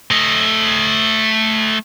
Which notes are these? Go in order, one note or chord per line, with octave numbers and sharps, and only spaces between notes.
A3 D#5